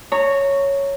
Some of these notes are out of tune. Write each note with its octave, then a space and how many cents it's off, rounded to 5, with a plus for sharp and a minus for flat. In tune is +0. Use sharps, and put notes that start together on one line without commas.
C#5 +0 A#5 -25